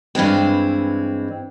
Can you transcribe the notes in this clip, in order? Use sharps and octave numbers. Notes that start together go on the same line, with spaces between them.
G2 E3 G#3 C4